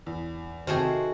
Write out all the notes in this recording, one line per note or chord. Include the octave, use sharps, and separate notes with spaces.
E2
C3 D#3 A3 F#4 G#4 C5